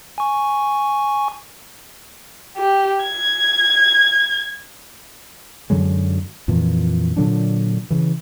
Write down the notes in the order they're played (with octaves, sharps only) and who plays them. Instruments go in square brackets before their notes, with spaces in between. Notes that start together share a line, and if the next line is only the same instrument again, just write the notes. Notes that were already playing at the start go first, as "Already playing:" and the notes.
[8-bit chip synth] G#5 C#6
[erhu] G4
G#6
[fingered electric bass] F#2 D3 F#3 G#3
F2 A#2 E3 F3
A#2 D3 F#3 D4
C#3 E3